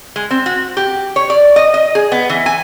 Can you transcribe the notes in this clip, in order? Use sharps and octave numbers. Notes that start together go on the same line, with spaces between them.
G#3
C4
F#4
G4
C#5
D5
D#5
D#5
G#4
B3
E3
G#5